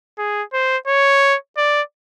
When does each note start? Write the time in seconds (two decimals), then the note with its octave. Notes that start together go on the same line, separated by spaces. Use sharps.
0.18 G#4
0.53 C5
0.88 C#5
1.57 D5